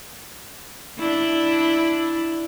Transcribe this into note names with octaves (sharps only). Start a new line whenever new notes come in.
D4 E4